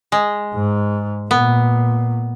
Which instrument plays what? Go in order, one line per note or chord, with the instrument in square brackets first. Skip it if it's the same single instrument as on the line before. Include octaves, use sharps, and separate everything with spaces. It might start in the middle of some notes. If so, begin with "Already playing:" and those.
[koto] G#3
[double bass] G#2
[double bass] A#2 [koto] B3